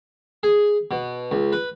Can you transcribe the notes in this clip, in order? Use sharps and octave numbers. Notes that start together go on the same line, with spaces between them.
G#4
B2
C#2
B4